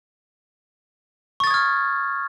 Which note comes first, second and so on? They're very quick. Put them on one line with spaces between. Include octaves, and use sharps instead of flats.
C#6 A6 D#6 G#6 F6